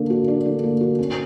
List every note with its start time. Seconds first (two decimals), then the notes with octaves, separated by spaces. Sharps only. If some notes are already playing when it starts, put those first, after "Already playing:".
Already playing: D3 A#3 D4
0.10 F#4
0.28 D4
0.45 D3
0.63 A#3
0.81 F#4
0.99 C#4